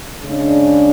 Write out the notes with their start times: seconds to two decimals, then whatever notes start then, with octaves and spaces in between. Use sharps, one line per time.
0.22 C#3 G#3 D4